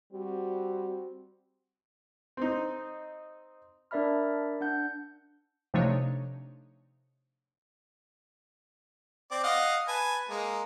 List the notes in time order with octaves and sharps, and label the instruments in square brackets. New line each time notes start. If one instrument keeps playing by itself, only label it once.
[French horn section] G3 C4 F#4
[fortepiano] C4 D#4
[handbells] D4 A#4 D5 E5 B5 F6
D4 F#5 G6
[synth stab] C3 F3 A3 D4 D#4 C#5
[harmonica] C4 D5
D#5 F5 F#5
B4 G#5 A5
G#3 A#3